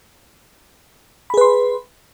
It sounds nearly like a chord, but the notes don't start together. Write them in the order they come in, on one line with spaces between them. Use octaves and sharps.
B5 G#4 B4 C6